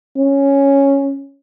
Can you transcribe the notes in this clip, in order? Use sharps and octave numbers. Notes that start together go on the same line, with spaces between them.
C#4